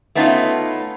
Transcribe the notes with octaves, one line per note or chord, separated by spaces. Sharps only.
A3 B3 C#4 D#4 F4